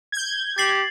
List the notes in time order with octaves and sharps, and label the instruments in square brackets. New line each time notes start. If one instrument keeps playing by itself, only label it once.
[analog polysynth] G6 G#6
[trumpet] G4 [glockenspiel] A6 C7 F#7